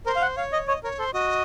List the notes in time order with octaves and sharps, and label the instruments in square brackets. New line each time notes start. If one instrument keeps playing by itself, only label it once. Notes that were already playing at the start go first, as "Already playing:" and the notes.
[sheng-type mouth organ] A#4 [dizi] C5
[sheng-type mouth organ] F5
F#5
[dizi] C#5 [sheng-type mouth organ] F5
[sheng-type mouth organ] D#5
[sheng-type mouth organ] C#5 [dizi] D#5
[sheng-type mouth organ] A#4 [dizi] C#5
[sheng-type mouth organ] A4 [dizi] C5
[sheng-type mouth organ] F#4 [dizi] D#5